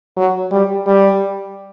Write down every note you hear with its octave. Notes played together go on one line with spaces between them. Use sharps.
F#3
G3
G3